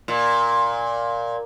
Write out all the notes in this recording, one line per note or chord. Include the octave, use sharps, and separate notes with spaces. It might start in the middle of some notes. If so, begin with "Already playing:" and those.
A#2